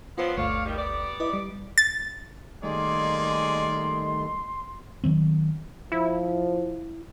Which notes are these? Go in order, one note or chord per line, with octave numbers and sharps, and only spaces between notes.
F3 F#3 B3 F4 C5
G1 D2 A3 C#5 D5 F5
D#3 G3
B3 G4 D5
E4 B4 D#5
G3
A6
D#3 G3 A3 A#3 G#4 D5 D#5 C6
D#3 F#3 C4
F3 E4